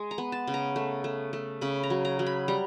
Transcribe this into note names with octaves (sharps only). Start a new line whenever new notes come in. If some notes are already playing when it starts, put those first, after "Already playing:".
Already playing: G#3
A#5
B3
A5
C#3
A#5
A3
A3
A3
C#3 B5
A#5
F#3
A#5
F#3
B5
G3 A#5